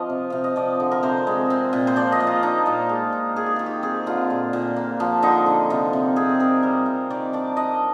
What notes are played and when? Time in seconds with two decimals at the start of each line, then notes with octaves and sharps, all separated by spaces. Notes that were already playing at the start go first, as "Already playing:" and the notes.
Already playing: F3 C4 F4 G4 D#5 F5
0.10 C3
0.30 C3 F5
0.44 D#5
0.56 F3 D5
0.80 D3
0.91 A#4
1.03 C3 C5
1.27 G#3
1.50 C4
1.73 A#2
1.87 C5
1.96 F3 D5
2.12 D#5
2.20 A#3
2.27 F4
2.42 D4 D#4
2.66 A#2 F4
2.89 G#3
3.12 D#4
3.36 D#3 G#4
3.46 G4
3.56 D#3 F4
3.66 G4
3.83 C4 G#4
4.06 D3 F4
4.30 A#2
4.53 A#2
4.76 A#3
5.00 F3
5.23 D3 D#4
5.46 D3
5.70 C3 F4
5.93 C3
6.16 C4 G#4
6.40 C4 A#4
6.63 G3 C5
6.86 C3
7.10 D#3 D5
7.33 D4 D5
7.57 D4 D#5